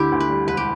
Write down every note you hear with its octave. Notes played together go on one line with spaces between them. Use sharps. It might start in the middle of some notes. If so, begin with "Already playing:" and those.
Already playing: D2 D3 E4 G4
D2
B4
G3
E1 B4
G4